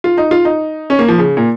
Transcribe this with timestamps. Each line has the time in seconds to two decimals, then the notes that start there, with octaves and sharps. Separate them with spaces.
0.04 F4
0.17 D#4
0.31 F4
0.45 D#4
0.90 C#4
0.99 A#3
1.08 F3
1.18 C#3
1.37 A#2